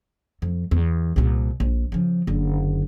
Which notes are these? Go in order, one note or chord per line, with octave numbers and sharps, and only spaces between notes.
F2
E2
C2 A#2
A#1
C#3 F3
F#1 D3